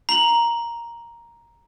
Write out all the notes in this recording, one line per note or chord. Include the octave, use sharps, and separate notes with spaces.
A#5 F7 F#7